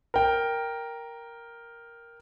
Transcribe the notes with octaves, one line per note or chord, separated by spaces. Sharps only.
A#4 G5